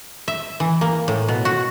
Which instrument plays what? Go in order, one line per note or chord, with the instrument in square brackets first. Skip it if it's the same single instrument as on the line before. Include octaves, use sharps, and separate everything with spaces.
[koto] E5
E3
A#3
A2
B2
F#4